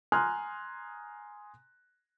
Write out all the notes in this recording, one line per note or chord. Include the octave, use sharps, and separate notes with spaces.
G#5 A#5 C6 D#6 F6 F#6